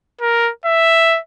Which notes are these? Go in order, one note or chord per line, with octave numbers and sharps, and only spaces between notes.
A#4
E5